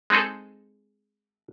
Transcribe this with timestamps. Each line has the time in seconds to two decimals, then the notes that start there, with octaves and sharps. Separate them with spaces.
0.10 G#3 C4 D#4 G#4 A4